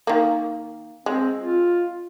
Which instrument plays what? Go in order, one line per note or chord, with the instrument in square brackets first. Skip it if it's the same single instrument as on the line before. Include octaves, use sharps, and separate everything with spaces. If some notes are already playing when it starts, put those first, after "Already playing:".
[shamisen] D#3 A#3
[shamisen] G#3 [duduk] C4
[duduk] F4